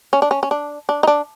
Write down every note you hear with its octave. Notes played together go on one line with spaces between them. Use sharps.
C#4
D4
C#4
C#4
D4
D4
D#4
D4